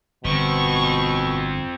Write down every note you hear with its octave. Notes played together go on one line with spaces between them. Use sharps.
G1 B2 F3 C4 C#6